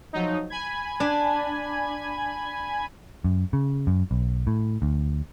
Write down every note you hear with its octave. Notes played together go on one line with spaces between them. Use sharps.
F3 F#3 D#4
G#5 B5 G#6
D4
F#2
C#3
F#2
B1
A2
D2